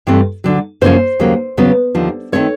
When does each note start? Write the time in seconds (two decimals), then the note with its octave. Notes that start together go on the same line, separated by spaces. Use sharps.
0.07 G2 E3 A3 C4
0.44 D2 D3 F#3
0.81 F#2 C#3 F3 A#3 C#4 C5
1.19 D#2 C#3 F#3 A#3
1.57 E2 C#3 F#3 B3
1.95 D#2 D3 F3
2.32 D#3 F#3 A3 C4 C#5